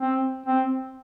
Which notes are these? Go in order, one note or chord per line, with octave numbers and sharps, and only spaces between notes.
C4
C4